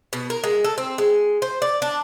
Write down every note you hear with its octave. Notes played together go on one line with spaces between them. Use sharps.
B2
A#4
G#3
A4
C4
G#3
C5
D5
D4